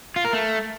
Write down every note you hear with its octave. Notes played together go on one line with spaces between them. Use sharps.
F4
A#4
A3